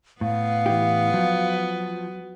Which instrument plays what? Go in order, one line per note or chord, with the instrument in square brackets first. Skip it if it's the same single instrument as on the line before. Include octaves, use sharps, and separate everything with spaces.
[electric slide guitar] A2 [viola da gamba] B3 [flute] F5
[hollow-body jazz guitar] E3 E4 G4
[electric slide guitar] F3 [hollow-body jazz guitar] F#3